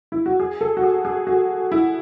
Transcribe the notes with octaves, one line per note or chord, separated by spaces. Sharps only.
E4
F#4
G#4
A4
F#4
G#4
G#4
F#4
E4